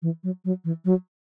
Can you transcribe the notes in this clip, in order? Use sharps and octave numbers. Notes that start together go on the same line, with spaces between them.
E3
F#3
F#3
E3
F#3